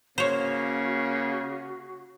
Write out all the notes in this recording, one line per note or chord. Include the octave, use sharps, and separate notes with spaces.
C#3 A#3 F#4 C5 C#5